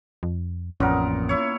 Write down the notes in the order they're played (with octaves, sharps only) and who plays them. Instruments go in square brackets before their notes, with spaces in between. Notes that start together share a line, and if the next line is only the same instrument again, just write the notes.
[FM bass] F2
[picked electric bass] A1 F2 [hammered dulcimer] A#2 B3 A#4 [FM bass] C#4
[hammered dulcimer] E4 C#5